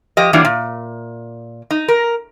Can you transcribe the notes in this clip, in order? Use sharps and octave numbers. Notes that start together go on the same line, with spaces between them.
F3 G4 D#5
E3 F#3 G3 A#3 D4
A#2
D#4
A#4